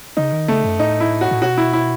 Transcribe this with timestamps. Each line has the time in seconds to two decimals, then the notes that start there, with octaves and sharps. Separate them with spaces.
0.17 C#3 D#4
0.32 D#3
0.48 C#3 A3
0.64 F#2
0.79 A2 D#4
1.00 E4
1.21 F#4
1.31 A2
1.42 B2 F#4
1.57 E4
1.73 E4